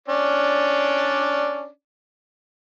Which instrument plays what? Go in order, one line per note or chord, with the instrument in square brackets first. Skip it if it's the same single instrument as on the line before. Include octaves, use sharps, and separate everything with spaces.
[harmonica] C#4 D4 D5